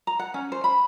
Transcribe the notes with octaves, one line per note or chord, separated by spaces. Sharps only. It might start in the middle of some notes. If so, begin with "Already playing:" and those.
A#5
F#5
C#4
C5
B5